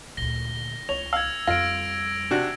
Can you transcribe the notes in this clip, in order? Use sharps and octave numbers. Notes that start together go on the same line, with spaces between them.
D2 A#2 A#6 G7
C#2 C#5 F7
F5 E6 G#6
F2 G3 F4 A#6 D7
C3 D4 F#4